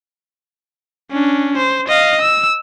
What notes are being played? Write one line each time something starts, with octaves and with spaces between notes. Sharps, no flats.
C#4 D4
C5
D#5 F5
E6